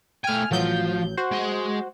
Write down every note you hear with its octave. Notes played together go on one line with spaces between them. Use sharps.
A3 G5 G#5 F6
A1 F3 F#3 G6
F#4 C5
G#3 C6